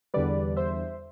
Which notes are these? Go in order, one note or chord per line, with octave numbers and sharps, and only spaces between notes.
E2 D3 G3 B4 D5
C5 E5